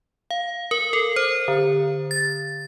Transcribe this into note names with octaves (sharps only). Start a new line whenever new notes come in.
F5
A#4
A4
C5
D3
A6